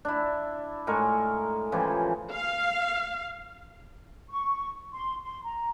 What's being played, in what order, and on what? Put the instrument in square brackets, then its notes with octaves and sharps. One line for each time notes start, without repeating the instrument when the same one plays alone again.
[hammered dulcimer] D4 E4
A2 G#3 A#4 C#6
C#3 E3 F3 G4
[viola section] F5
[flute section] C#6
C6
C6
A#5